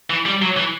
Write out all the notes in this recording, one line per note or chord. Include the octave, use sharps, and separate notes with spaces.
E3
G3
F#3
E3